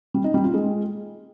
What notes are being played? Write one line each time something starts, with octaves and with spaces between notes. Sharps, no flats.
G3
D#4
G3
F4
G#3